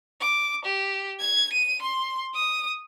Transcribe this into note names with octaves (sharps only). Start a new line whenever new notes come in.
D6
G4
G#6
D#7
C6
D#6